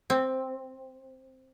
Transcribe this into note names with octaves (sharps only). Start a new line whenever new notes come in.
C4